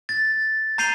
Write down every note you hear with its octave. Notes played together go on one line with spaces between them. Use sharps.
A6
A#5 G6 C7 D#7 F7 G7